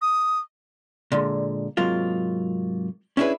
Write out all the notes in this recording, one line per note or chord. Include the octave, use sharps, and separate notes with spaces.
D#6
A#2 D3 G#3
G#2 C3 F#3 A#3 F4
C#4 D4 E4 F#4 G#4 B4